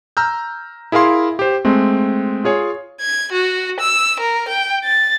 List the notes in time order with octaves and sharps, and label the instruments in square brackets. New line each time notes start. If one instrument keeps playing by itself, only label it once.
[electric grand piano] A#5 E6 F6 G6
E4 G#4 A#4 F5 C6
G4 C5
G#3 A3 C4
F4 G#4 C#5 G#5
[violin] G#6
F#4
E6
A#4
G5
A6